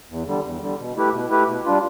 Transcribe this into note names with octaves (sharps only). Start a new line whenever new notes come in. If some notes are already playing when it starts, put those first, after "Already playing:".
E2
D3 G3
E2
D3 G3
B2
A3 E4 G4 B4
B2
A3 E4 G4 B4
B2
G3 D4 F4